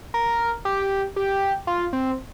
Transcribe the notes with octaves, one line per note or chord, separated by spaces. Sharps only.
A#4
G4
G4
F4
C4